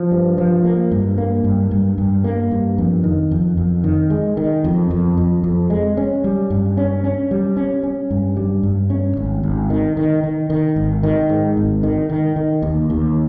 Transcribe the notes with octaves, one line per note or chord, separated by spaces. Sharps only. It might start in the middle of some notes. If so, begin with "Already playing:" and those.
Already playing: F3
G2
F3
A#3
G2
A#3
G2
G2
G2
A#3
G2
F2
D#3
F2
F2
D#3
G#3
D#3
F2
F2
F2
F2
G#3
C#4
G3
G2
C#4
C#4
G3
C#4
C#4
G2
G3
G2
C#4
G#1
G#1
D#3
D#3
D#3
D#3
G#1
D#3
G#2
G#1
D#3
D#3
D#3
D#2
D#2